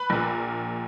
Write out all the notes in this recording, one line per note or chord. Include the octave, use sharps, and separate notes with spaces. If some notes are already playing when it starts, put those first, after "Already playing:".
Already playing: B4 B5
A#1 A#2